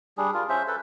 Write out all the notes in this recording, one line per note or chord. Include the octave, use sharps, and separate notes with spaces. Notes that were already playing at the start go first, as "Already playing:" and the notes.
G3 D4 G#4
F4 A#4
C#4 C5 E5
A4 B4